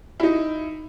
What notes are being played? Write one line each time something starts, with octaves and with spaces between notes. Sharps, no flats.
D#4 E4